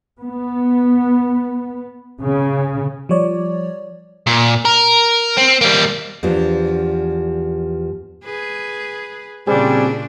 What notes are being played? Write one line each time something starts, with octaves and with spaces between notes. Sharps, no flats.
B3
C#3
F3 G3 C#5 D5
A#2
A#4
C4
G3 A#3
E2 F3 D4 G4
G#4 B4
A#2 C#3 G3 C4 D4 G#4